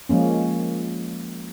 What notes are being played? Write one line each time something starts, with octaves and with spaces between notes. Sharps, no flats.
F3 G#3 A#3 C#4